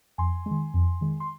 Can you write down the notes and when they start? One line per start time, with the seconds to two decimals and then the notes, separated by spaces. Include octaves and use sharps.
0.18 F2 G#5 C6
0.46 D#3 G#3
0.74 F2
1.01 D#3 G#3
1.20 C6